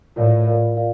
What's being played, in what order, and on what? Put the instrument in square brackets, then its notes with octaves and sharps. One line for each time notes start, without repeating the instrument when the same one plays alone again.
[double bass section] A2 [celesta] F4 A#4 D5 F5
[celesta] F4 A#4 D5 F5
F4 A#4 D5 F5